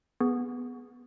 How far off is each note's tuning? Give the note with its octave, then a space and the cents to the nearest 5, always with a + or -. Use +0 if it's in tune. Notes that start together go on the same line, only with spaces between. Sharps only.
B3 +0 G#4 +0